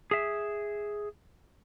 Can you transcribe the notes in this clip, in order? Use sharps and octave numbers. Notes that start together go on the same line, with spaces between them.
G#4 E5